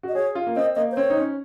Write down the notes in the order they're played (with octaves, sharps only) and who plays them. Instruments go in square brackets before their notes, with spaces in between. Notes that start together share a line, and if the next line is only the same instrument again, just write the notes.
[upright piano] F#4
[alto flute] D#5
[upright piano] G#4 [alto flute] C#5
[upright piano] F4
A#3
[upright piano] C4 [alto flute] D#5
[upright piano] A#3 [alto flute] D#5
[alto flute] C5
[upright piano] C4 [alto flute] C#5
[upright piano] D#4
C#4